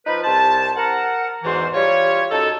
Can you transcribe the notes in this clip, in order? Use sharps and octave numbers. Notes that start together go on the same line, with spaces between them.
F3 D#4 B4
C2 C5 A5
A#4 F#5
E2 G#2 E3 F#4 C5
G3 F4 C#5
F#2 D#4 A4